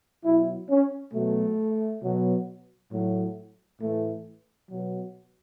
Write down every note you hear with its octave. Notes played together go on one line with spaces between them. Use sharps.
B2 F#3 E4
C#4
B2 F#3 A3
B2 F#3
A2 F#3
A2 E3 A3
B2 F#3